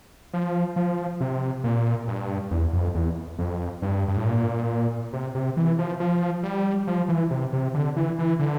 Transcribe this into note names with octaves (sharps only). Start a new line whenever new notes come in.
F3
F3
C3
A#2
G2
E2
F2
E2
F2
G2
G2
A2
A#2
C3
C3
E3
F3
F3
G3
F3
E3
C3
C3
D3
E3
E3
D3